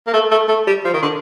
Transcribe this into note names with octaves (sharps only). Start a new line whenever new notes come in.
A#3
A3
A3
A3
G3
F3
D#3
D3